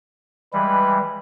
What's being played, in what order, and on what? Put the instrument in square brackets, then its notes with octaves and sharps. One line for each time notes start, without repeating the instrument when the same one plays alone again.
[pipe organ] E3 G3 G#3 [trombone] B4